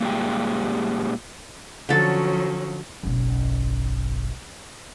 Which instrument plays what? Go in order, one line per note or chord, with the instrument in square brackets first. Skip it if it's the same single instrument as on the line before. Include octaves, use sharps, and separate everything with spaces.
[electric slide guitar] A#2 G3 G#3 G4
[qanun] D3 A4 [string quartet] F3 F#3 C#4
[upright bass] F#1 B1